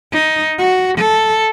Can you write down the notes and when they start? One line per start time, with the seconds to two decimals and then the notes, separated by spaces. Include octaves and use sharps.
0.12 D#4
0.59 F#4
0.99 A4